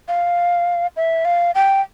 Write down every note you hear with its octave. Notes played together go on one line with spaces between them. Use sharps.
F5
E5
F5
G5